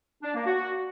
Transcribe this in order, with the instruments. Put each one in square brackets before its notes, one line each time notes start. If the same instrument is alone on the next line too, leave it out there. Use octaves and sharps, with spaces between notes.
[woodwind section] D4
A#3
F#4